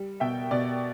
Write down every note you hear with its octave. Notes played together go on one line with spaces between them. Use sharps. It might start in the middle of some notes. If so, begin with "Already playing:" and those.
Already playing: G3
B2 E5 G5
B2 D5